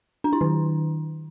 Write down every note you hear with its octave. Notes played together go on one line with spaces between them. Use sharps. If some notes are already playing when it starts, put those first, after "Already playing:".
D4
E4
D#3